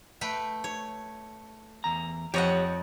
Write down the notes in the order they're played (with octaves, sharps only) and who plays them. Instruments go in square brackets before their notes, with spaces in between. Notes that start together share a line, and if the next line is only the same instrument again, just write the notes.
[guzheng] A3 B4 G5
C#5
[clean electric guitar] E2 A#5
[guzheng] F2 D#5 F#5 [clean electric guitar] G4 C#5